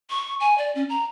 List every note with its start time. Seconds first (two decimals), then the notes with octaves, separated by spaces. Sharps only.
0.10 C#6
0.40 G#5
0.58 D5
0.75 C#4
0.89 A#5